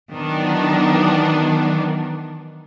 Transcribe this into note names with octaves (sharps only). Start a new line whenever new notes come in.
D#3 E3 F#3 B3 D4 D#4